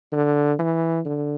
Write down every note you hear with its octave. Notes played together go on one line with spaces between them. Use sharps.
D3
E3
D3